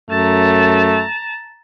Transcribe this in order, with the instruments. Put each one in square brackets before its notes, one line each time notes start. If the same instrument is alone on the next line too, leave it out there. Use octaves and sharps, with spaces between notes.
[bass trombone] F#2 [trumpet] A3 [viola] A5 A#5